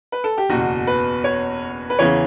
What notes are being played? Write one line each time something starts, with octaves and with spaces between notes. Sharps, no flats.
B4
A4
G4
F#1 E2 B2 F#4
B4
C#5
B4
E2 C#3 E3 C#5